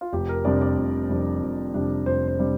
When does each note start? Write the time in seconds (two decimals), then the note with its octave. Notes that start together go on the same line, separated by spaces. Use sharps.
0.01 F4
0.13 F1 G4
0.29 A#4
0.45 F2 C3 G3 D4 D5
0.61 D5
0.77 F1
1.09 F2 C3 G3 D4
1.42 F1
1.74 F2 C3 G3 D4
2.06 F1 C5
2.28 C5
2.39 C3 G3 D4